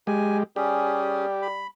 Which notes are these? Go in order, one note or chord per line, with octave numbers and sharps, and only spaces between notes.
G#3 G4 G#5
G3 C#4 G4 G#4
B5